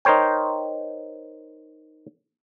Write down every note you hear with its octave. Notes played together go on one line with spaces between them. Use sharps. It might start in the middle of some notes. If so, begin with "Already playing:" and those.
D#4 A#4 C5 C#5 G5